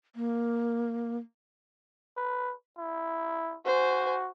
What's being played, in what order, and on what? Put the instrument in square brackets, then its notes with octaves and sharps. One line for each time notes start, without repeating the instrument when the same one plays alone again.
[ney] A#3
[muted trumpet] B4
E4
[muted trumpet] F#4 [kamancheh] C5 G#5